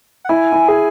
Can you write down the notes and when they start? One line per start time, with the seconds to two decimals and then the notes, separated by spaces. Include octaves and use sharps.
0.25 F#5
0.29 E4 G#5
0.52 E4
0.68 G#4